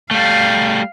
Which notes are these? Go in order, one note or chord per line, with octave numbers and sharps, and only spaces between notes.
G3 A3 F5